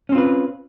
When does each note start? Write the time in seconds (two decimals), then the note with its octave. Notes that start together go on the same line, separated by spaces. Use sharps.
0.09 C#4
0.12 C4
0.15 F4
0.18 B4